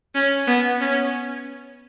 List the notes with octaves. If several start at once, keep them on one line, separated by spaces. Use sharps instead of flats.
C#4
B3
C#4